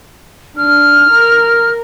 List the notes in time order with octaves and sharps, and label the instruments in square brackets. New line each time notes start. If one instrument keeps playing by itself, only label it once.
[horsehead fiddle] D4 [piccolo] F6
[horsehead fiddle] A#4